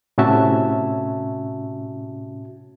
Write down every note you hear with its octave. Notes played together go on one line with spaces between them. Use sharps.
A2 C3 C#4 F#4 E5 A5